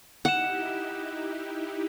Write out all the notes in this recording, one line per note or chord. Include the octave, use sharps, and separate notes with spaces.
D#4 E4 G4 F#5 F#6 E7